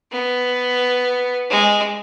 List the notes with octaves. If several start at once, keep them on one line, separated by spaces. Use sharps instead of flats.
B3
G#3